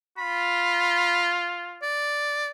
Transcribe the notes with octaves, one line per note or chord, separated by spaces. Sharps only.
F4 B5
D5